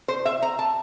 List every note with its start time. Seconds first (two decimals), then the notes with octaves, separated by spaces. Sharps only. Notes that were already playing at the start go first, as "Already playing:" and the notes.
0.08 C5
0.25 E5
0.42 A#5
0.59 A5